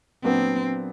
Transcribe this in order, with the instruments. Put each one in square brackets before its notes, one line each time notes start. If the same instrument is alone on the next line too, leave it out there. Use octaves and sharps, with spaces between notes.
[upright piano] A#2 F#3 B3 D4 [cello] C4